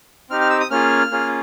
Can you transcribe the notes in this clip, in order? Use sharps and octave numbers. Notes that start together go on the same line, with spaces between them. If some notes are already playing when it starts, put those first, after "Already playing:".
C4 D#4 G4 F6
F6
E6
D#6
A#3 C#4 F4 G#4 F6
A#3 C#4 F4 G#4